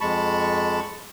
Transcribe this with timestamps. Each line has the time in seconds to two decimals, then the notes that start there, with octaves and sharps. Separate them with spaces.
0.01 F2 G#3 A5 B5 C#6